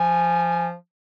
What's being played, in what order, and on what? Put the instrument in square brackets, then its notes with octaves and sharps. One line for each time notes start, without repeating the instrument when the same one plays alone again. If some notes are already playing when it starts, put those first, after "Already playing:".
Already playing: [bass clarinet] F3 [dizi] G#5